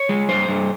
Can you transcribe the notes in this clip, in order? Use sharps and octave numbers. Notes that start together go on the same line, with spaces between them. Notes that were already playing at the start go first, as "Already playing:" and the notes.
Already playing: C#5
G#3
G2 C5
G2